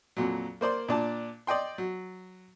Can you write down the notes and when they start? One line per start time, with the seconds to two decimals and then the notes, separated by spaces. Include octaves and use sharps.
0.17 F2 A#2 F#3
0.61 A#3 C5 D5 C6
0.89 A#2 D4 A5
1.47 D5 D#5 G5 C6
1.78 F#3